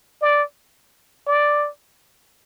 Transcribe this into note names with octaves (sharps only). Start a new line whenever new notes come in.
D5
D5